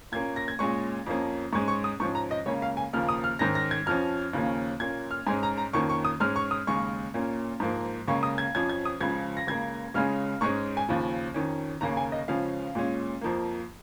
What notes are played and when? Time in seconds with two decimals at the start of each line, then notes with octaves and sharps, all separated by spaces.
0.12 A#2 A#3 C#4 G#6
0.36 A#6
0.48 G#6
0.59 A#2 G#3 C#4 C#6
1.06 F2 F3 A#3 C#4
1.53 G#2 G#3 C#4 C#6
1.68 C#6
1.84 D#6
2.00 G#2 F3 C#4 C#6
2.15 A#5
2.31 D#5
2.46 C#2 C#3 A#3 C#4 C#5
2.62 F5
2.77 G#5
2.93 D#2 C#3 F3 A#3 F6
3.09 D#6
3.24 F6
3.39 G#2 D#3 C#4 A#6
3.55 A#6
3.71 G#6
3.86 F2 F3 C#4 F6
4.33 D#2 C#3 F3 A#3 C#4
4.80 A#2 A#3 C#4 G#6
5.11 F6
5.27 G#2 G#3 C#4 G#5
5.43 A#5
5.57 A#5
5.73 F2 D#3 A#3 C#4 C#6
5.89 C#6
6.05 D#6
6.20 G#2 G#3 C#4 F6
6.36 C#6
6.51 D#6
6.67 D#2 C#3 G#3 C#6
7.14 A#2 A#3 C#4
7.60 G#2 F3 A#3
8.08 C#2 C#3 A#3 C#4 C#6
8.23 D#6
8.38 G#6
8.55 F2 F3 C#4 G#6
8.69 G#6
8.85 D#6
9.01 C#2 C#3 F3 G#6
9.37 A#6
9.47 C#2 C#3 A#3 G#6
9.94 C#2 C#3 G#3 C#4 F6
10.41 G#2 G#3 C#4 C#6
10.77 G#5
10.89 D#2 C#3 F3
11.34 F2 D#3 C#4
11.81 D#2 C#3 A#3 C#4 A#5
11.97 G#5
12.12 D#5
12.28 C#2 C#3 F3 C#4 F5
12.75 A#2 G#3 C#4
13.21 F2 F3 A#3